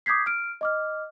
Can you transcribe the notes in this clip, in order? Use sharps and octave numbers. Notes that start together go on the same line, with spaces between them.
D6 D#6 G6 G#6 B6 C7
F6 D7
D#5 D6 F6